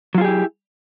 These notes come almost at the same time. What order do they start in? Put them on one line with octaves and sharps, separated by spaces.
F#3 F4 G#4 G4 E4